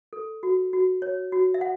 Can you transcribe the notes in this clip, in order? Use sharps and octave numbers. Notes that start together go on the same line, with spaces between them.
A4
F#4
F#4
C#5
F#4
E5
F#5